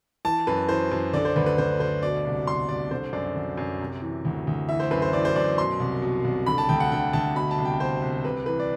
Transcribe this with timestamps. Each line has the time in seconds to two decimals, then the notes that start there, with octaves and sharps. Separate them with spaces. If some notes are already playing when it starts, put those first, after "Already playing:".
0.25 E3 A5
0.47 F#2 B4
0.69 E3 C5
0.92 F#2
1.13 D3 D5
1.25 C5
1.36 D2 B4
1.46 B4
1.58 D3 C5
1.80 D2 C5
2.03 B2 D5
2.25 C2
2.47 B2 C6
2.69 C2 D5
2.91 D3 C5
3.13 F#2 D5
3.36 D3
3.58 F#2
3.81 C3
4.02 E3
4.25 D2
4.47 D2
4.69 E3 E5
4.80 C5
4.91 F#2 B4
5.02 C5
5.13 E3 D5
5.25 C5
5.36 F#2 D5
5.58 B2 C6
5.80 C2
6.02 B2
6.25 C2
6.46 D3 B5
6.58 A5
6.69 D2 G5
6.80 F#5
6.92 D3 G5
7.13 D2 A5
7.35 B2 B5
7.51 A5
7.58 C2
7.65 G5
7.80 B2 C5
8.02 C2
8.24 C3 B4
8.46 E3 B4
8.60 D5